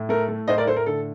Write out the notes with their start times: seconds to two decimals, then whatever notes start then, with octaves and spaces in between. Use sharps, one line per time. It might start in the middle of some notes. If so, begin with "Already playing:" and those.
Already playing: A2
0.09 A3 A#4
0.28 A3
0.48 A2 C5 D#5
0.57 A#4 D5
0.67 A2 A4 C5
0.76 A#4
0.86 D3 A4